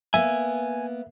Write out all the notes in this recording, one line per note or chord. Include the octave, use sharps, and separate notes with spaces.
A#3 B3 E5 G#5